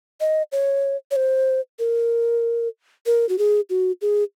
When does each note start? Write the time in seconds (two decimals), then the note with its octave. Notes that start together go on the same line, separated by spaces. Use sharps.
0.20 D#5
0.52 C#5
1.11 C#5
1.16 C5
1.79 A#4
3.06 A#4
3.29 F#4
3.38 G#4
3.70 F#4
4.01 G#4